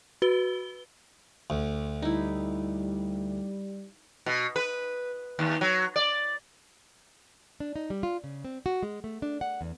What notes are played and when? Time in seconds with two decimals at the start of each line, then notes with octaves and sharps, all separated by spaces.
0.22 F#4 B4 G7
1.50 D2
2.02 G3 D#4 E4
4.26 B2
4.56 B4
5.39 D#2
5.61 F#3
5.96 D5
7.60 D4
7.76 D#4
7.90 G3
8.03 F4
8.24 C#3
8.45 C4
8.66 F#4
8.83 G#3
9.04 A3
9.22 D4
9.41 F#5
9.61 E2